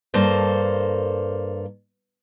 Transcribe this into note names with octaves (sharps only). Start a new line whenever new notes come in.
G2 A#3 A4 C5